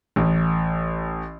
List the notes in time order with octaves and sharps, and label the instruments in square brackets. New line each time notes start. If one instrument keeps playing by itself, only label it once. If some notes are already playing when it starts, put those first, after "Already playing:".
[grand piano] A1